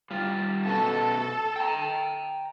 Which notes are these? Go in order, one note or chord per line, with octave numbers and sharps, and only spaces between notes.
G3 F4
B2 C#4 F#4 A4
G5 A#5